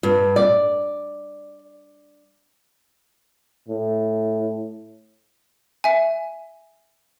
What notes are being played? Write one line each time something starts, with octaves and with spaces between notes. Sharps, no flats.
G2
D5
A2
E5 G#5